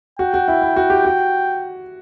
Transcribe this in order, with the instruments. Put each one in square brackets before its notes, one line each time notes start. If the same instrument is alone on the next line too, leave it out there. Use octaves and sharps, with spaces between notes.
[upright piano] F#4 [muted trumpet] G5
[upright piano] F#4
E4
E4
F#4
G4
F#4